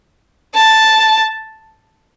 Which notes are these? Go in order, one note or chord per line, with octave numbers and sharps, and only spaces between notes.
A5